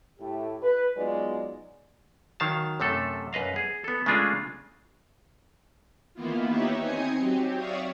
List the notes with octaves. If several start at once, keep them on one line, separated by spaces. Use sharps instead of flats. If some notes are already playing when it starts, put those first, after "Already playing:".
A2 A3 E4 G4
B4
F#3 G#3 B3 D#4 F4 D5
D#3 F#3 F5 A5
F#2 C3 A3 A4
F#2 B4 D#5 F5
G#4
B3 A4
C#3 G#3 A3 D4 F4 G#4
D#3 E3 A#3 B3 E4 F4
D#4 G4 B4 C#5 E5
C4 D#4 G#5 D#6 C#7
F#3 C4 G4
C#5 D5 E5 F5 C#6 D#6